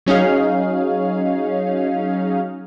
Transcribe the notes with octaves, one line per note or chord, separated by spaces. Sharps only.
F#3 C#4 D#4 G#4 F5